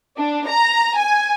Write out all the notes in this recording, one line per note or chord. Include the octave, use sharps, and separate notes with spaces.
D4
A#5
G#5